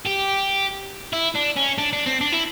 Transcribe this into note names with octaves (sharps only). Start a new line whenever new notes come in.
G4
E4
D4
C#4
D4
D4
C4
D4
E4